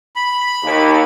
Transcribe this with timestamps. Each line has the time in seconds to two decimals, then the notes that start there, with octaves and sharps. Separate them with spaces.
0.16 B5
0.64 D#2